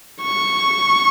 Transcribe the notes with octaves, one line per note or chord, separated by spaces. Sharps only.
C#6